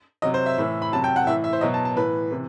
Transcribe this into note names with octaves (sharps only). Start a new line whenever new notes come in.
C3 F#3 D#5
C5
E5
A2 E3
B5
C3 F#3 A5
G5
F#5
A2 E3 E5
E5
C5
B2 F#3 D#5
A5
A5
A2 E3 B4
C3 E3